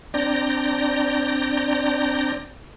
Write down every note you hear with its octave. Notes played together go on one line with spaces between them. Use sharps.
C4 D4 D5 A#5 G6 A#6